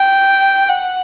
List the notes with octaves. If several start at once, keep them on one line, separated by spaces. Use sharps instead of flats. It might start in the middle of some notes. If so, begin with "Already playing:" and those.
Already playing: G5
F#5